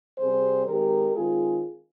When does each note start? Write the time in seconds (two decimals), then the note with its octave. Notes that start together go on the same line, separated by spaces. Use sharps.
0.19 C3 G3 C4 G#4 C5
0.66 D#3 G#3 C4 G4 A#4
1.15 D#3 G#3 C4 F4 G#4